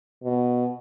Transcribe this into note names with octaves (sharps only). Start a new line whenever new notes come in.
B2